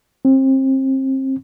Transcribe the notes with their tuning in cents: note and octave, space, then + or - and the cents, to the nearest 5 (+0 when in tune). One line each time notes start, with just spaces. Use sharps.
C4 +30